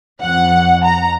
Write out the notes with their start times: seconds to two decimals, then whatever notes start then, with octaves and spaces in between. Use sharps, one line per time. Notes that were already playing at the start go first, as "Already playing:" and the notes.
0.21 F2 F#5
0.84 A#5